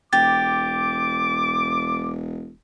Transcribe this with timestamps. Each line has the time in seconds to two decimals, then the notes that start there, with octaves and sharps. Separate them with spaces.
0.13 E1 G4 D6 A6